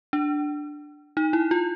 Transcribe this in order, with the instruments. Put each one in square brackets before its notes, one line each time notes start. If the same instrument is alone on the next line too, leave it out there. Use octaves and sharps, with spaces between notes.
[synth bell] D4
D#4
E4
F4